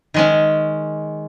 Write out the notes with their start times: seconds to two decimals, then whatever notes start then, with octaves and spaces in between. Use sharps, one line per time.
0.14 D#3 G#3 C#4